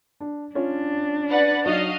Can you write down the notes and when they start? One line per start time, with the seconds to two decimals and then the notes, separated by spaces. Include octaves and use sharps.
0.20 D4
0.55 C#4 D4 F4 C#5
1.29 B4 D5 F#5
1.66 F#3 D#4 F#4 D#5 F5